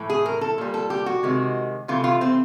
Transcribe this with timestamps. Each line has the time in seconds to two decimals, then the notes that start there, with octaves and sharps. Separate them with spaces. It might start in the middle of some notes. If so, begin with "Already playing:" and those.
Already playing: A2 E3 A3
0.10 G#4
0.26 A#4
0.41 A4
0.58 A#2 G3
0.74 A4
0.90 G4
1.06 F#4
1.23 C3 D#3 G#3
1.88 C3 E3 A3 F4
2.04 F4
2.21 C4